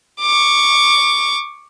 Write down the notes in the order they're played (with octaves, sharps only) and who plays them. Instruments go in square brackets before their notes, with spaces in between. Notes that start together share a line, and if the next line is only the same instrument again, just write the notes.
[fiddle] C#6 D6